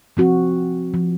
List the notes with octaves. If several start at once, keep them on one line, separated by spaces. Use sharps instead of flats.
F3 C4 F#4
F3